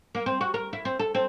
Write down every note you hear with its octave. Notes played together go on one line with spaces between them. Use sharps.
A#3
C4
F#4
A#4
E4
C4
A4
C4